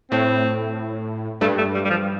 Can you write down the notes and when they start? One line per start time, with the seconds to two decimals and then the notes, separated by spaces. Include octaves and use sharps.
0.12 A2 C4
1.41 G2 A3
1.58 A3
1.75 G3
1.85 G3
1.90 F3